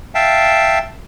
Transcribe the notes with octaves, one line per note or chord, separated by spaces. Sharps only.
E5 F5 G5 A5